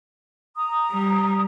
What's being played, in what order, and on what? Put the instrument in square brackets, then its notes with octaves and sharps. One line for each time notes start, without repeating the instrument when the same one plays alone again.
[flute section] A#5 D#6
[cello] G3